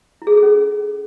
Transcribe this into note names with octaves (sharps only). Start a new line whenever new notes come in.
E4
G#4
A4
G#4
C#4